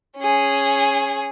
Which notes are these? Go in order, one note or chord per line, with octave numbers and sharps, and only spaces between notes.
C#4 G#4